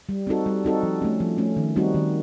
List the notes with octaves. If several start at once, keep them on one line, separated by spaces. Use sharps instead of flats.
G3
C4 D#4 F#4 A4
G3
C4 D#4 F#4 A4
F3
A3 C#4
F3
A3 C#4
D#3
G3 C4 D#4 F#4
D#3